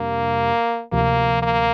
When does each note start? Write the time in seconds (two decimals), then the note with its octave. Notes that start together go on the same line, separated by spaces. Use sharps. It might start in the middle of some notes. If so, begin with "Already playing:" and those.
Already playing: F2 C3 G3 A#3 D4 G4
0.92 D2 C3 F3 A#3
1.42 A#3